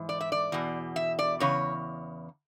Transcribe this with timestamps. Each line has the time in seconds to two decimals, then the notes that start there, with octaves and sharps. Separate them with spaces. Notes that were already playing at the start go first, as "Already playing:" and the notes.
Already playing: G#2 E3
0.09 D5
0.21 E5
0.32 D5
0.52 E2 B2
0.96 E5
1.19 D5
1.40 E2 C#3 C#5